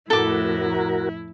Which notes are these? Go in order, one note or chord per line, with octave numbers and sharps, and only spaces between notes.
F2 A2 E4 F#4 A4 A#4 D6